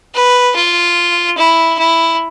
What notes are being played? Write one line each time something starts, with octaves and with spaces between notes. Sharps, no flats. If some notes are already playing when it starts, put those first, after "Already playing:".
B4
F4
E4
E4